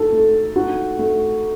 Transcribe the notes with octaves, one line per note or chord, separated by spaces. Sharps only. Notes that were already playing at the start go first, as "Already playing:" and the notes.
Already playing: D#4 F#4 A4
A3
D#4 F#4
A3